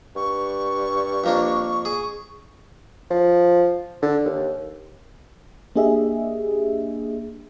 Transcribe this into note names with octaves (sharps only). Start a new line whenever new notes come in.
G2 C#6
F2 A#3 D4
G#4
F3
D3
D#2
A#3 D4 G4 G#4 D#5 E5